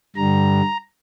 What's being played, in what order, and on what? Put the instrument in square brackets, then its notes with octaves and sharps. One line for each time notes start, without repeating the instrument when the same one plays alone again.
[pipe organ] G2 D3 G3 A#5